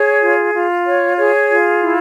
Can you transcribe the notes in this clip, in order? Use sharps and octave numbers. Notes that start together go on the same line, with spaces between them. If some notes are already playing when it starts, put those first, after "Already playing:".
Already playing: G#4 C#5
F4
F4
C#5
G#4 C#5
F4
E4